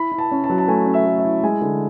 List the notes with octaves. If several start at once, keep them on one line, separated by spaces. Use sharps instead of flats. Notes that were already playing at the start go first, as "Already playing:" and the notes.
Already playing: E4 B5
E4
A5
C#4
A5
F#3
A5
A3 G#5
C#4
E5
A3
E5
E4
G#3 G#5
D3